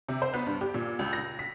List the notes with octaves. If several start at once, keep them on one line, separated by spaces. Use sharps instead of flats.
C3
C5
B3
G2
G4
A#2
C#2
A#6
B6